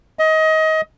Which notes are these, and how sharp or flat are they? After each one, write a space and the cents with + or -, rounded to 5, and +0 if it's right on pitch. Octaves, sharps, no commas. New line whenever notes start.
D#5 +25